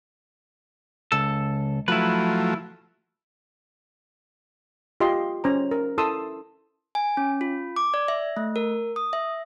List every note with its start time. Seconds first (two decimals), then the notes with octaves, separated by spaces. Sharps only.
1.12 C#2 A4
1.88 F3 F#3 A3 E4 B4
5.00 F4 G4 D#5 C6
5.44 C#4 C5 A#5
5.71 A#4
5.98 E4 A4 A5 C6 D#6 E6
6.95 G#5
7.17 C#4
7.41 F4
7.76 D6
7.94 D5
8.08 E5
8.37 A3
8.56 A#4
8.96 D#6
9.13 E5